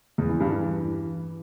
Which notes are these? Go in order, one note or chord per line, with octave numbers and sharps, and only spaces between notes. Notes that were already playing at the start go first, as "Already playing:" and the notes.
E2
E3
G2
E3